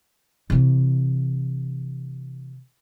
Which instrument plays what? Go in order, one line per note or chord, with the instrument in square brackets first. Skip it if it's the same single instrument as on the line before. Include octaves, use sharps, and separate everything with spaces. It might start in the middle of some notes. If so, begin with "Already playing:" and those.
[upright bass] C3 E3